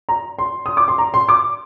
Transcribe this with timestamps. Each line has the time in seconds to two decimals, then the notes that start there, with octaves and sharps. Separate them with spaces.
0.09 A#5
0.39 C6
0.66 D#6
0.77 D6
0.88 C6
0.98 A#5
1.14 C6
1.29 D6